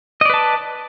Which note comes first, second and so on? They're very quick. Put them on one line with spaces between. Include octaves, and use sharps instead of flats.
D#5 D5 B4 A5